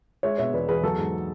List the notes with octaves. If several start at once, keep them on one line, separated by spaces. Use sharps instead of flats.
G#3 C#5 E5
B2 C#5 E5
E2 B4 D5
E2 G#4 B4
F#3 A4
G#2